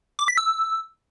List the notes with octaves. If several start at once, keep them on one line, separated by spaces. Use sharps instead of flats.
D6
B6
E6